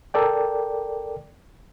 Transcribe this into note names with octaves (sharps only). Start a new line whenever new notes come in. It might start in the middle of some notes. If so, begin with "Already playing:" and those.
A4 A#4 D5 G5